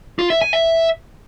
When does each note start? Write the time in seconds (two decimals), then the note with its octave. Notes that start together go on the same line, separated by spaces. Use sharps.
0.19 F4
0.30 E5
0.42 G#5
0.53 E5